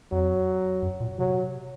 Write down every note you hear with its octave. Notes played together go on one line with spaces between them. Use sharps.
F2 F#3
F#2
A#2
C3 F#3